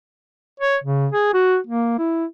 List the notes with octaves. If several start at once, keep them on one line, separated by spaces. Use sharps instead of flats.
C#5
C#3
G#4
F#4
A#3
E4